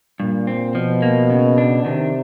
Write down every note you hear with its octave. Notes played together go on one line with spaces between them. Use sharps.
G2 A#2
C4
B2 F3
A#3
C#3
D4
C3 D#3